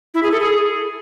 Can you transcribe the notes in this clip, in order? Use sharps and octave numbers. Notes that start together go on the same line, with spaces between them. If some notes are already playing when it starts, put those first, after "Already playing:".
E4
G#4
A4
G#4